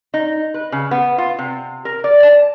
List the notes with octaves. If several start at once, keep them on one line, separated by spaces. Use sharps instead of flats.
D#4
B4
C#3
B3
F4
C3
A#4
D5
A5